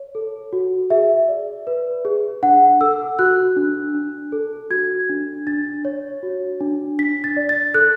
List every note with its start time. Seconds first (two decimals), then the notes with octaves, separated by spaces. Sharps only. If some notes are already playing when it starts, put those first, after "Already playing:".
Already playing: C#5
0.15 A4
0.53 F#4
0.90 G#4 E5
1.28 D5
1.67 B4
2.05 G#4
2.43 D4 F#5
2.81 A4 E6
3.19 F#4 F#6
3.56 D4
3.95 D4
4.32 A4
4.70 F#4 G#6
5.09 D4
5.47 D4 A6
5.85 C#5
6.23 F#4
6.60 D4
6.99 D4 B6
7.24 A6
7.37 D5
7.49 A6
7.74 A4 F#6